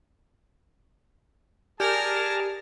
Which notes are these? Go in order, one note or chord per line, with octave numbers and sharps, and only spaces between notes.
G4 G#4 A#4 D5 G#5 A5 F6